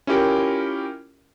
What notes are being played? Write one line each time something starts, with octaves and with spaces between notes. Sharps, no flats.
C#4 E4 F4 G4 A#4